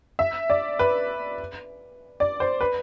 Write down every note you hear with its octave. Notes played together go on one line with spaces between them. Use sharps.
E5
D5
B4
D5
C5
B4